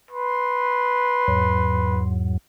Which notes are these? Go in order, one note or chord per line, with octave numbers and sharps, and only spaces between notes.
B4 C6
E2 G#2 F#3